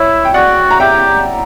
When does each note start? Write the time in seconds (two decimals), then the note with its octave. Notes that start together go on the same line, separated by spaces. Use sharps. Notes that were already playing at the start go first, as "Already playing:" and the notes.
Already playing: E4 C#5 E5
0.25 G5
0.34 F#4 D5 F#5
0.71 A#5
0.80 G4 E5 G5